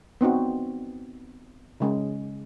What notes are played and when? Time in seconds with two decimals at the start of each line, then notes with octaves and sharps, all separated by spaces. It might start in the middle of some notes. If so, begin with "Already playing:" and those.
0.21 B3 C4 D#4 F#4
1.80 C#3 G#3 C#4